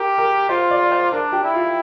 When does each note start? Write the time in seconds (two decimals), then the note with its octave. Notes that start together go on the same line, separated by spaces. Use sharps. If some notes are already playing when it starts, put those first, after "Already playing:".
Already playing: G4 A#4
0.18 A#4
0.49 F4 C5
0.71 D5
0.92 C5
1.12 D4 A#4
1.32 G4
1.43 E4
1.54 F4